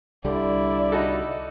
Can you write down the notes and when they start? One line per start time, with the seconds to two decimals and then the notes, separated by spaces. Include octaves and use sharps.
0.24 C2 D3 G3 E4 D5
0.92 D#4 F#4 A4